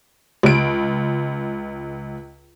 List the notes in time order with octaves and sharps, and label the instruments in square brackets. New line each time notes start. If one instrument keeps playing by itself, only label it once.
[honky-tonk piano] C#2 D7